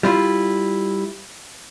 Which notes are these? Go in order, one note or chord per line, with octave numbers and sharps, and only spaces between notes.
G3 E4 F4